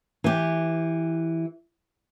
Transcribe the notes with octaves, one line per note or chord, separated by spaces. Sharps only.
E3 G4